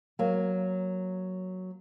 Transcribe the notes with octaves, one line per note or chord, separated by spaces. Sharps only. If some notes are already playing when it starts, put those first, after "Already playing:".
F#3 A#3